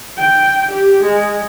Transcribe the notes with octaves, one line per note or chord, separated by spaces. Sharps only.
G5
G4
G#3